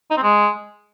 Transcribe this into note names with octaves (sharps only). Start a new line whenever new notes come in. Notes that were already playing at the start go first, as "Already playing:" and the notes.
D#4
C4
G#3